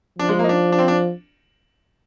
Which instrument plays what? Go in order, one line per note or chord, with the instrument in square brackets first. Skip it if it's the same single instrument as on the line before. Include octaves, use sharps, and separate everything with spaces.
[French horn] F3 [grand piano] D4
[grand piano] G#3
A#3
D#4
D4
D4
C4
D4